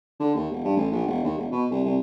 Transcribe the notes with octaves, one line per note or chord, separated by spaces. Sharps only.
D3
D#2
E1
G2
A1
A#1
E1
D#2
E1
B2
C2
C2